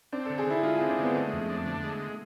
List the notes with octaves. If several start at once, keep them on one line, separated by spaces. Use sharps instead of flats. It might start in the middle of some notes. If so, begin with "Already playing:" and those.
C4 D4
D3 A4
G#4
D3 E4
G#3 F4
C4 G#4
D4
D3 B3
G#3 A3
F2
D4
D3
G#3